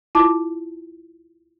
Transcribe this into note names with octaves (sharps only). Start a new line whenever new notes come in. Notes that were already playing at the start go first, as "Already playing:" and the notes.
E4 F4 A5 D6